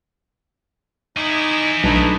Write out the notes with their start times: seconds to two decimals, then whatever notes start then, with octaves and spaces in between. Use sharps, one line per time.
1.17 D#4 E4 G#4 C#6 D6
1.84 B1 A3 D4 D#4 B4